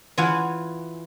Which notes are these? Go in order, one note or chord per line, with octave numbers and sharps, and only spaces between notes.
E3 E4 F4 F#5 G#5